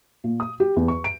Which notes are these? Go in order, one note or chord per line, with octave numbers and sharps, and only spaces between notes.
A#2
D#6
G4
E2
C#6
D7